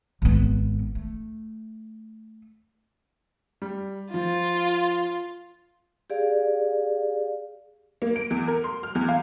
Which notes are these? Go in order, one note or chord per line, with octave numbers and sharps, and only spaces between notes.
G#1 B3
A3
G3
F3 F4
G4 G#4 D5 F5
A#3
D7
E2
A#4
C6
F6
E2
F5